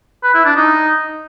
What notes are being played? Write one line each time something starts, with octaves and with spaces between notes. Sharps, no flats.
B4
E4
D4
D#4